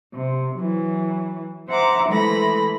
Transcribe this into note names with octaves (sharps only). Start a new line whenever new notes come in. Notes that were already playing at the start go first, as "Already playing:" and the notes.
C3
E3 F#3
C5 E5 F#5 A#5 D6
E3 G#3 A3 A4 B5 A#6